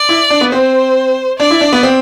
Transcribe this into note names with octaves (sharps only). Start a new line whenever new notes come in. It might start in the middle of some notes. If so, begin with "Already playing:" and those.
Already playing: D5
E4
D4
B3
C4 C5
D4 D5
E4
D4
B3
C4